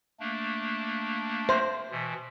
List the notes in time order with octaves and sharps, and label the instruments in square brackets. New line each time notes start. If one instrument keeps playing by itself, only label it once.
[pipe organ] A3 A#3 D4
[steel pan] C5 [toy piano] E5 C6
[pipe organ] B2 E3